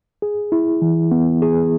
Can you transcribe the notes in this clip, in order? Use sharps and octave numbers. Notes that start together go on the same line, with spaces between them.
G#4
E4
E3
B3
G#4